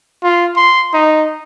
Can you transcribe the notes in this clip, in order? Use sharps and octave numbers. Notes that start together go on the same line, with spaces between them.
F4
C6
D#4